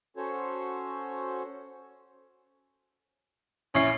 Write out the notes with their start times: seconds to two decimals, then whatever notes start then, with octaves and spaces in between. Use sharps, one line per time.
0.17 C#4 F#4 A4 C5 C#5
3.75 A#1 C#4 E4 C7